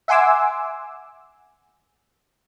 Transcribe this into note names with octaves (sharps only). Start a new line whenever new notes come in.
E5 F#5 G#5 C6 D6 E6